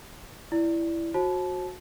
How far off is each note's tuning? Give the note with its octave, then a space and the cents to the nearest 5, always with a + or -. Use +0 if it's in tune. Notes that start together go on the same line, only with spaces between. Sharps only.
E4 +10 D5 +0
F#4 -20 C5 +35 A5 -25